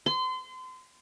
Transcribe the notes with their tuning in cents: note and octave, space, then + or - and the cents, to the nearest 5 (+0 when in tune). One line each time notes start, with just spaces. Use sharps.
C6 -30